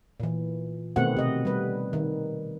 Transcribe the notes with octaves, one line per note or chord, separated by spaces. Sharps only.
A#2 E3
B2 D#3 A3 B3 C4 F#5
C3 D#5
G3 B4
D#3